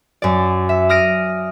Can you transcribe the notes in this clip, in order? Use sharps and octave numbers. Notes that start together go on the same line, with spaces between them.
F#2 D5
E5
D#6 F6 A#6 D7 D#7